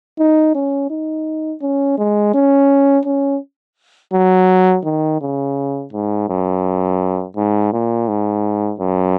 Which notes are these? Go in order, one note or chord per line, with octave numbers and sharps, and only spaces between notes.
D#4
C#4
D#4
C#4
G#3
C#4
C#4
F#3
D#3
C#3
G#2
F#2
G#2
A#2
G#2
F#2